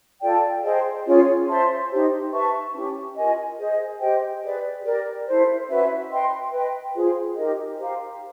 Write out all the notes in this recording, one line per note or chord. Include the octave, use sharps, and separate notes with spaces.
F4 A4 D5 G5
G#4 C5 D#5 G5
C#4 F4 G#4 C#5
C5 E5 A5 C6
D#4 G4 C5
B4 E5 A5 C#6
C#4 E4 G4
F4 A#4 D#5 G#5
G#4 C5 D#5
G4 C5 D#5 G5
G#4 B4 D5
G4 A#4 D5
E4 A4 C5
C#4 F#4 B4 E5
B4 D#5 G5 C6
B4 D#5 G5
F4 G#4 C5
D#4 G4 A#4 D#5
G4 C5 F5 A#5